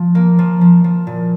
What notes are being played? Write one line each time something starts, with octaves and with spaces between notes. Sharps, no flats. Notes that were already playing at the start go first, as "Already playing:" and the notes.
Already playing: F3
A#3
F3
F3
F3
A#2